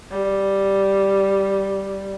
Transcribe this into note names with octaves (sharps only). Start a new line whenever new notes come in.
G3